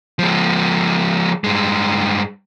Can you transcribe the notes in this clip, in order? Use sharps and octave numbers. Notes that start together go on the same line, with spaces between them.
F3 G#3
G2 G#3